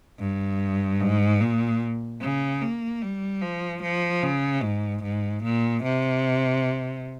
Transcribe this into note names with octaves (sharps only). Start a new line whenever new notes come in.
G2
G#2
A#2
C#3
A#3
G3
F3
F3
C#3
G#2
G#2
A#2
C3